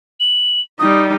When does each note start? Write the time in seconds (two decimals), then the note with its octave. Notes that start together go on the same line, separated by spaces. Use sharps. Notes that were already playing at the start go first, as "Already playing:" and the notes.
0.20 F#7
0.79 G3 D#4 D#6